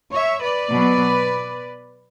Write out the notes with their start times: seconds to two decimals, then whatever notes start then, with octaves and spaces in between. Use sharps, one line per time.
0.14 C#5 E5
0.43 B4 D5
0.71 B2 F#3 B3